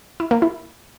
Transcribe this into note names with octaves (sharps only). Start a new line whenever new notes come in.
E4
A#3
E4